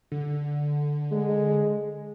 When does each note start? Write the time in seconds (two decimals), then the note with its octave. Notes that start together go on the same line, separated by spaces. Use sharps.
0.12 D3
1.11 G#3